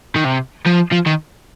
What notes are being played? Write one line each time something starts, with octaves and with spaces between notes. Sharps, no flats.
D#3
C3
F3
F3
D#3